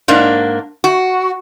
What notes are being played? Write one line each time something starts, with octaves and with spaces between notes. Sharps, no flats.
G#2 A#3 D4
F#4